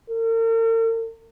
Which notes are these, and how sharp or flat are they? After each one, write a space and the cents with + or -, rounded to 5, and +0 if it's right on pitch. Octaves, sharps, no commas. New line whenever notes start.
A#4 -45